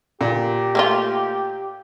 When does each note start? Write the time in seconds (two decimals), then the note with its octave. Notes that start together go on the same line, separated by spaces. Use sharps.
0.21 A#2 G4
0.75 A3 A#3 F4